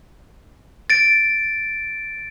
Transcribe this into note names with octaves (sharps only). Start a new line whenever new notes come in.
A6 D7